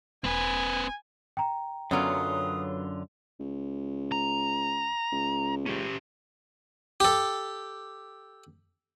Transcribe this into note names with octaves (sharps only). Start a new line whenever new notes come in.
E1 C4 B4 G#5
G5 A#5
F#2 D3 F#3 B3 C#4 F4 D#6
C#2
A#5
C#2
C#4 G4
G4 A4